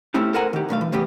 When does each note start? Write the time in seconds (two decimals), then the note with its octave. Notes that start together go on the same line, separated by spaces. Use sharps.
0.14 A3 C4 C#4 E4 G4
0.34 A4 A#4 C5 F#5 G#5 A#5
0.53 D#3 G4
0.69 B1 G2 A3 F5
0.81 E3
0.92 A2 C#3 E3 G3 B3 G4